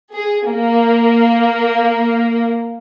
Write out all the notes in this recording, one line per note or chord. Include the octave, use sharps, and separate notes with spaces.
G#4
A#3